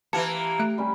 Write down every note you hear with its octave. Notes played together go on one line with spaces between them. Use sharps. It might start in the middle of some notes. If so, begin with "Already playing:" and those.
E3 A#3 G4 A5 C#7
A3 F#6 D7
G3 C#4